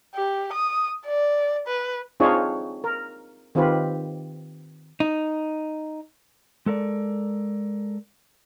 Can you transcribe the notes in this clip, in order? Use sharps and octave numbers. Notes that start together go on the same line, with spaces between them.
G4
D#6
D5
B4
C4 D4 D#4 F4 G#4 C#5
A#4
D#3 C4 F4 G4 B4
D#4
G#3 A4 A#4 D5